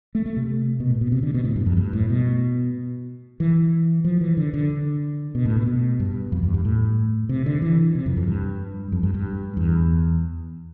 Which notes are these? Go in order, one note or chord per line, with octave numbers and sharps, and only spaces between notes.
A3
A3
C3
B2
A2
B2
C3
D3
B2
A2
G2
F2
G2
A2
B2
E3
F3
E3
D3
D3
B2
A2
B2
B2
G2
F2
E2
G2
A2
C3
D3
E3
C3
F2
F2
G2
F2
G2
G2
E2